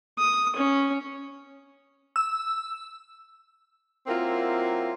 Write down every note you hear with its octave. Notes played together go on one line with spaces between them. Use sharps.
D#6
C#4
E6
F#3 A#3 C4 E4 F4